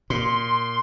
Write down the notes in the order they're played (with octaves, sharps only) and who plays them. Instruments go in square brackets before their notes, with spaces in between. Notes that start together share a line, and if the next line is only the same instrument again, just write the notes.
[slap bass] A#2 [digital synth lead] C6